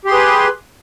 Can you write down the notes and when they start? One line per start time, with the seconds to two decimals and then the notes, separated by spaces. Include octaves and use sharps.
0.05 G4
0.08 C6
0.10 G#4
0.13 B4